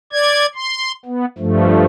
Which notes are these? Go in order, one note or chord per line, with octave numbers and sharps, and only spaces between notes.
D5 G#6
C6
B3
G2 F3 A3